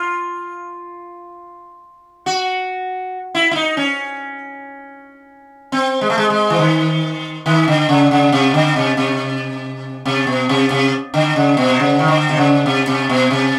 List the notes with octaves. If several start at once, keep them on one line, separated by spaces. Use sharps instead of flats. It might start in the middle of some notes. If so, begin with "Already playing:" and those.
Already playing: F4
F#4
E4
E4
D#4
C#4
C4
G#3
A3
G#3
G#3
E3
D#3
D#3
D3
C#3
C#3
C3
D3
C3
C3
C3
B2
C3
C3
D3
C#3
B2
C3
C#3
D#3
D3
C3
C#3
C3
C3
B2
C3